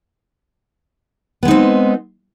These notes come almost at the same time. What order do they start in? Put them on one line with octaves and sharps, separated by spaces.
B3 G#3 D#4 C4